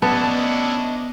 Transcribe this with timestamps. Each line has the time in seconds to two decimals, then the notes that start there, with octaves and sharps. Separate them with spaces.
0.02 B3 C#4 D4 E4 D#5 A5